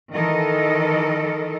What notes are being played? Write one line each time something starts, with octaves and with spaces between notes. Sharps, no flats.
D#3 E3 A4 A#4 D#5